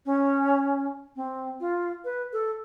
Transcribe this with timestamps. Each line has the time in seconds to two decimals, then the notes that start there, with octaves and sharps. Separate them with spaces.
0.06 C#4
1.16 C4
1.60 F4
2.05 B4
2.33 A4